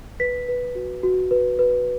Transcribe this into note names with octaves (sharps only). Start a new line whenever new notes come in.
B4 B6
B4
F#4
F#4
B4
B4